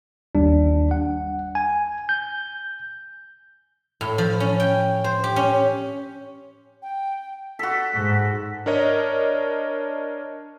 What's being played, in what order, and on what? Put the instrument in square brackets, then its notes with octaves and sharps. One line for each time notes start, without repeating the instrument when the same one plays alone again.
[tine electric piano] G1 D#2 G3 D4
F#5
G#5
G6
[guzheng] A2
F3
C#4
G5
C5
G4
C#4
[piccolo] G5
[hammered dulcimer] F#4 A4 [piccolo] B6
[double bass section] G#2
[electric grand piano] D4 A#4 C#5 D#5